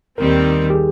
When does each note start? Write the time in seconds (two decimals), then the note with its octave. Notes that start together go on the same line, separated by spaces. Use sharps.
0.18 D#2 D#3 G3 C4 A#4
0.70 G4
0.74 G#4